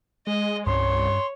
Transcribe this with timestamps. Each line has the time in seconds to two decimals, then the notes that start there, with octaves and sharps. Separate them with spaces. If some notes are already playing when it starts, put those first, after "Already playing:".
0.27 G#3 D#5
0.67 C2 G2 C#4 C#5 C6